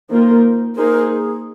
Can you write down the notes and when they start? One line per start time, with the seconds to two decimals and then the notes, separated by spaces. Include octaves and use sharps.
0.10 D#3 A#3 F4 A#4 C5
0.76 A#3 D#4 G#4 A#4 C5
1.09 G#4